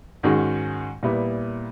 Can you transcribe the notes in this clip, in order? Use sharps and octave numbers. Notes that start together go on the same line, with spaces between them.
G#2 D#3 G#3 C#4 F#4
A#2 G3 B3 E4